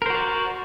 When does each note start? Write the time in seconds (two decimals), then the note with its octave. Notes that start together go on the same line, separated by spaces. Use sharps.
0.02 A#4
0.06 C5
0.10 F#4
0.14 D5